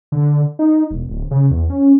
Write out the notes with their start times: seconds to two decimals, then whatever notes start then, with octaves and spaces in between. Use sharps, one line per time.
0.12 D3
0.59 D#4
0.91 E1
1.09 D1
1.31 C#3
1.51 E2
1.70 C#4